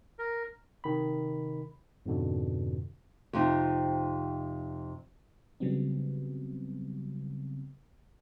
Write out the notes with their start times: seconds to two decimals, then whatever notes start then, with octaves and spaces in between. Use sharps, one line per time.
0.19 A#4
0.84 C3 D#3 B5
2.06 F2 G#2 B2 D3
3.33 F2 C3 D#4
5.60 C#3 F#3 G3 B3 C4